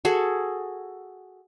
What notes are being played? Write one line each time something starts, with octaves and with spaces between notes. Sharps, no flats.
F#4 G#4 A4